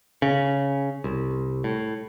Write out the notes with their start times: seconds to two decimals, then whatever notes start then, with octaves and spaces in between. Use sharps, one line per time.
0.22 C#3
1.04 C2
1.64 A2